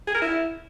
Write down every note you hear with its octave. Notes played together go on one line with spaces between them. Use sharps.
G#4
A#4
E4